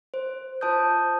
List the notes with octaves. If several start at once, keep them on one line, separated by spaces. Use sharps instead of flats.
C5
F4 C5 A5 D#6 G6